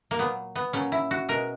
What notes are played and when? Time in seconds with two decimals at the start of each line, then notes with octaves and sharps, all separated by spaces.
0.11 A#3
0.19 A#2 F#3 B3
0.55 B3
0.73 A#2 F#3 C#4
0.92 E4
1.11 F#4
1.28 B2 G#3 A#4